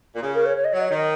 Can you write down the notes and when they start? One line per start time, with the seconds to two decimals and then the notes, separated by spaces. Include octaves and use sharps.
0.15 A#2
0.22 C#3 G#4
0.34 A#4
0.45 C#5
0.57 C#5
0.64 D#5
0.73 F#3 C#5
0.81 D#5
0.88 D#3 C#5
0.96 D#5